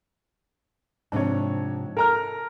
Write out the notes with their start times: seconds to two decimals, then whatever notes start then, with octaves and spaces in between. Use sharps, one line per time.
1.12 G#2 C3 F3 D4 C#5
1.97 A4 A#4 A#5 F6